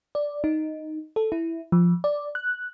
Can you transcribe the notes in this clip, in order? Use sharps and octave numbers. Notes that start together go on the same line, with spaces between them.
D5
D#4
A4
E4
F3
D5
F#6